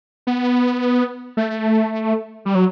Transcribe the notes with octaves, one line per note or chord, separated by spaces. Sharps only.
B3
A3
G3
F#3